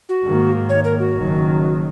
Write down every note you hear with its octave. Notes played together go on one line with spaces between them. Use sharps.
F#4
G#2 D#3 A#3
C#5
A#4
F#4
F#1 F#2 D#3 F#3